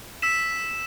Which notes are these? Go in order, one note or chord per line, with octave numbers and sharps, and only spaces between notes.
E6 B6 E7